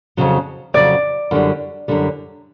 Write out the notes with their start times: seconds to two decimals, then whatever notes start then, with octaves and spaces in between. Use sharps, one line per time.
0.17 F2 C#3 F#3
0.74 F2 C#3 F#3 D5
1.31 F#2 D3 G3
1.88 F#2 D3 G3